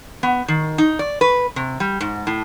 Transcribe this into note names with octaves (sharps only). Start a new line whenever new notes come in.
B3
D#3
D#4
D5
B4
C3
G3
G#2
A2